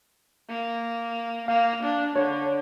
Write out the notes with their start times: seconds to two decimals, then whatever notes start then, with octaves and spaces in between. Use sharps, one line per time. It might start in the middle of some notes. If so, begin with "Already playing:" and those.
0.50 A#3
1.48 A#3 F5
1.83 D4
2.16 D3 C#5